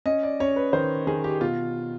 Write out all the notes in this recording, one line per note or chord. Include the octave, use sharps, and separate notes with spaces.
C#4 D#5
D5
C#4 C#5
B4
D#3 C5
D#3 G#4
G4
B2 F4